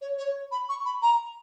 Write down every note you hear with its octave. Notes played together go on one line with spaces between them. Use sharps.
C#5
C#5
B5
C#6
B5
A#5